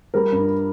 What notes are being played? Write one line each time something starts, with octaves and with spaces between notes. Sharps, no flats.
G3 A#4
G2